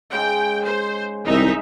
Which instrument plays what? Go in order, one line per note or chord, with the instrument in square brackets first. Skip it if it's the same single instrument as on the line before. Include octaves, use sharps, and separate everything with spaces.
[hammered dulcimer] G#2 C#3 G#3 [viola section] G5
[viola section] C5
[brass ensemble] C2 D#3 [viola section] D#4 E5